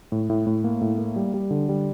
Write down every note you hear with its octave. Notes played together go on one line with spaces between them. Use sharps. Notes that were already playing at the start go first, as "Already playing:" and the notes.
A2
A2
A2
A#3
A2
A#3
G3
G3
D3
G3